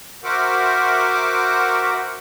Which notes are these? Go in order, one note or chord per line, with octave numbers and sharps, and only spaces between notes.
F#4 A#4 C5 E5 F#5 D6